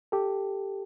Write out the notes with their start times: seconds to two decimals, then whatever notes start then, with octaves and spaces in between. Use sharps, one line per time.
0.12 G4 A4